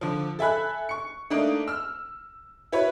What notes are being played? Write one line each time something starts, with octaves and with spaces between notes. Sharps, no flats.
D3 F3
A4 E5 G#5 B5 F#6
C#6 C#7
A3 A#3 D4 D#4
E6 F6
E4 F#4 B4 C#5